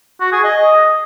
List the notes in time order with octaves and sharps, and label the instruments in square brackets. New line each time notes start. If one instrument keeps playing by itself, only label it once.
[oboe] F#4
G#4
D#5